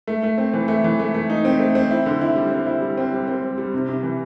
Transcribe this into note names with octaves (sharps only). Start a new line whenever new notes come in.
A3
A3
C4
E3
A3
E3
A3
A3
D#4
C4
A3
C4
E4
D3
E4
G3
C4
E4
G3
C4
G3
C4
G3
G3
C3
C3
E3